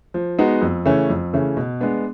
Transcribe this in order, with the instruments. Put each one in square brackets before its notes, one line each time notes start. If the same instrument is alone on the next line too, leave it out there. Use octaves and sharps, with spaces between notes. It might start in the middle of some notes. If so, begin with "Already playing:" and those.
[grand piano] F3
G#3 B3 D#4 F#4
F2
C#3 E3 A3 C#4
F2
C#3 E3 A3 C#4
B2
G#3 B3 D4